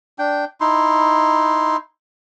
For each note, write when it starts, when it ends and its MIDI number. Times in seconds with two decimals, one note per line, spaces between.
0.19 0.45 62
0.19 0.45 79
0.61 1.76 63
0.61 1.76 64
0.61 1.76 84